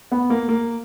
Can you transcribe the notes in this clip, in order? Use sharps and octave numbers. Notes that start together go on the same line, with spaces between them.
B3
A#3
A#3